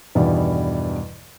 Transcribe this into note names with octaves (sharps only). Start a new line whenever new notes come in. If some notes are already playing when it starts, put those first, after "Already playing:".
E2 G2 B2 D#3 G3 E4